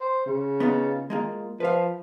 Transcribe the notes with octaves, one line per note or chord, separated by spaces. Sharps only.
C5
C#3
B3 D#4 F4
G#3 A#3 F4
F3 B4 F5